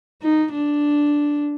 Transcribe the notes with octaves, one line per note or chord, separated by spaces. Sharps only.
D#4
D4